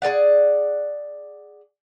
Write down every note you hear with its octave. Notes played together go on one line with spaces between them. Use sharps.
G#4 A4 D5 F#5